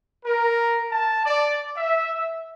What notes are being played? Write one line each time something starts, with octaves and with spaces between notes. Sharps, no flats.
A#4
A5
D5
E5